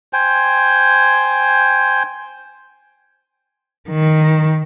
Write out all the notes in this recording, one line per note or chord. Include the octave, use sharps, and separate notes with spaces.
C5 G5 G#5
D#3